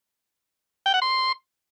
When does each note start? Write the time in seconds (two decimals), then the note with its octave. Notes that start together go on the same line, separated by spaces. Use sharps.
0.86 G5
0.94 F#5
1.02 C6